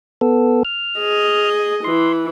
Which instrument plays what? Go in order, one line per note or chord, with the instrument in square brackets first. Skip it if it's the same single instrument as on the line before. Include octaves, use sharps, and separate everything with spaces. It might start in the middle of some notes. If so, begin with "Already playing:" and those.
[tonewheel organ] B3 A4
F6
[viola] G#4 D#5
[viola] E3 [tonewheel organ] C6